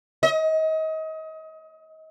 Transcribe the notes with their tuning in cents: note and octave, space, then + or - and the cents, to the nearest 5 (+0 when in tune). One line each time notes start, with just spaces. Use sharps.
D#5 +30